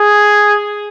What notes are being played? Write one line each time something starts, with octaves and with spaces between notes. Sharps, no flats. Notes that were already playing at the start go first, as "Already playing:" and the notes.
Already playing: G#4